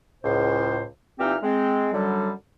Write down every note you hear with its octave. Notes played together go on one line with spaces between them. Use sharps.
C#2 A2 C5
A#2 E3 C4 D#4 G4 F6
G#3 C4
F#2 D3 F#3 G3